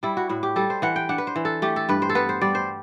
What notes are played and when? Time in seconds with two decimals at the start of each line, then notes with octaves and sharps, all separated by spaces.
0.03 G3 E4
0.17 F#4
0.29 A2 F#4
0.43 G4
0.56 G3 A4
0.70 C5
0.82 E3 F#5
0.96 G5
1.09 D4 F#5
1.18 B4
1.27 C5
1.36 E3
1.45 A4
1.62 A3 G4
1.76 A4
1.89 G2 B4
2.02 C5
2.10 A4
2.15 B3 B4
2.29 C5
2.41 G3 D5
2.55 C5